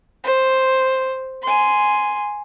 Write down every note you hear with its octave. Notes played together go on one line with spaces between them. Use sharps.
C5
G#5 C6